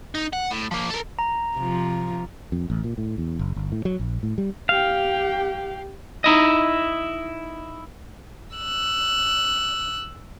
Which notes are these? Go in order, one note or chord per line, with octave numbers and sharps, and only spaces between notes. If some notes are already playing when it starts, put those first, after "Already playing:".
D#4
F#5
A2
F3 A#3
A4 A#4
A#5
C3 F3
F2
A1
A#2
A2
E2
F#1
G1
A2
F#3
A#1
A2
G3
G4 F5 G5
D#4 E4 D#5
E6 F#6